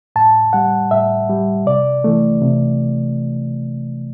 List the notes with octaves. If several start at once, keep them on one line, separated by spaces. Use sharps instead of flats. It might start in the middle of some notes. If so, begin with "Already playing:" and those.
A2 A5
G3 F#5
A2 E5
G3
C3 D5
E3 A3
C3